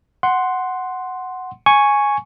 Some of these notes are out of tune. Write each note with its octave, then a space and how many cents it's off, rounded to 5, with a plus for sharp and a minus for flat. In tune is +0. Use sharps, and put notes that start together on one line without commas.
F#5 +0 C6 +0
G#5 +0 C#6 +0